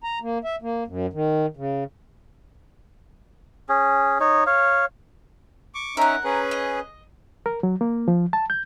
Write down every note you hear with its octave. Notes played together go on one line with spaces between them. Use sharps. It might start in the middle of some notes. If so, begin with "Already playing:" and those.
A#5
A#3
E5
A#3
F#2
D#3
C#3
C#4 G#4
D#4 C#5
C#5 F5
C#6 D6
C#4 D#4 A#4 E5 F#5
C#4 G#4 B4
D#5
A#4
F#3
A#3
F3
A5
G6